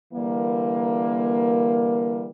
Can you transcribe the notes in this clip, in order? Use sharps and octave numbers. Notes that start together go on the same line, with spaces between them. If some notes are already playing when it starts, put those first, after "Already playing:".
D3 E3 G3 A#3